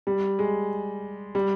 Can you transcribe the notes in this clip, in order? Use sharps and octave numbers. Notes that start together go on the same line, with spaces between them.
G3
G#3
G3